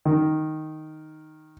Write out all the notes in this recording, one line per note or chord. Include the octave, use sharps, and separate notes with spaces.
D#3